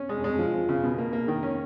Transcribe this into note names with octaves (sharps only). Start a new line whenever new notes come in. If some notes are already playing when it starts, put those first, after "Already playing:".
Already playing: C#4
G#3
G#3
F3
F3
C#3
B2
A#3
A#3
D#3
C#4